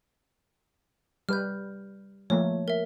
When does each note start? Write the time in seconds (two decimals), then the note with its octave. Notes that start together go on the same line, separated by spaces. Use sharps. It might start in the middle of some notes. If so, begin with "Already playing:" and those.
1.29 G3 B4 F6 G6
2.30 F3 A3 A#3 C#5
2.68 A#4 E5